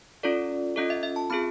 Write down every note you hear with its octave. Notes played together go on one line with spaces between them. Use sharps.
C#4 F4 A4 D5
C#4 F4 A4 D#5
E5
E5
A5
C4 F4 G#4 B5